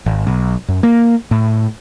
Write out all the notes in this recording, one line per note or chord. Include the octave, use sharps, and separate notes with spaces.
G#1
B1
F#2
A#3
A2